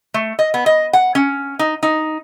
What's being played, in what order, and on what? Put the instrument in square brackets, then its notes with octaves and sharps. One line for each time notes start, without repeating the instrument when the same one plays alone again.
[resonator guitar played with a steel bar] A3
D#5
B3
D#5
F#5
C#4
D#4
D#4